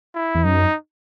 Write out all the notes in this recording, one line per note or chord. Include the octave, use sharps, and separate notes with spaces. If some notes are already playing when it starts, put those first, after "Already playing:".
E4
E2
F#2 D#4